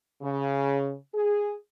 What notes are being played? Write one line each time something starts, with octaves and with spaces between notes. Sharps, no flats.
C#3
G#4